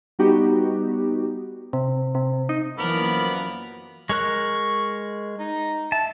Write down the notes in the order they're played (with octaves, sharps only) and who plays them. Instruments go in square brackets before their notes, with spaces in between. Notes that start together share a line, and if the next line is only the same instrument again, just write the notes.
[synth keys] G3 B3 D#4 F#4 G4
[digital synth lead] C3
C3
D#4
[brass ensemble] F#2 F3 B3 [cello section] E3 A#3 [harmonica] A#4 D5 [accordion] B5
[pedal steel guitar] G#3 A#4 F#6 [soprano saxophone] C#6
[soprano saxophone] D#4
[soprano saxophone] E5 [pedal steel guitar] A5